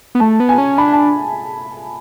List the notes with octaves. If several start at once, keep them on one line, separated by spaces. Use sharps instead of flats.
B3
A3 A5
B3
G#5
C#4
D4 B5
A5